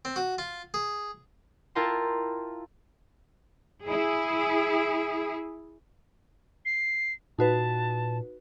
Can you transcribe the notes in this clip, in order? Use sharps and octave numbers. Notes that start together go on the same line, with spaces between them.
C4
F#4
F4
G#4
E4 F4 A#4 G5 A5 C6
E4 G#4
C7
A#2 D#4 F#4 B4 A5